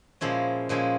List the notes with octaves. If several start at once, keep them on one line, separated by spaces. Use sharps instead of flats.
A#2 F3 G#3 C#4 E4
A#2 F3 G#3 C#4 E4